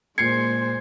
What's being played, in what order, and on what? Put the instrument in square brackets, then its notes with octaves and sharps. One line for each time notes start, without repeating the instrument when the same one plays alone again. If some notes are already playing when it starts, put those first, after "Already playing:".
[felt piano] A#2 C7 C#7 [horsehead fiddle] G#3 C5 [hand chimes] G#6